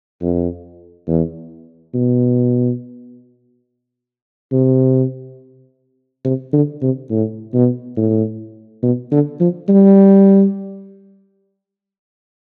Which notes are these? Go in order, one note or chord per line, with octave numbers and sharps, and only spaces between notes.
F2
E2
B2
C3
C3
D3
C3
A2
B2
A2
B2
D3
F3
G3